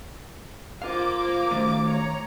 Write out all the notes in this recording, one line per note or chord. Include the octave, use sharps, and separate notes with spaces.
A#3 F4 C5 F5 D6
D#3 A3
C#5 A#5